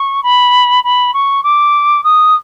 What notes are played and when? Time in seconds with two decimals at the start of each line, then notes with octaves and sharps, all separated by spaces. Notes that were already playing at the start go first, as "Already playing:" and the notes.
Already playing: C#6
0.23 B5
0.84 B5
1.13 C#6
1.43 D6
2.03 D#6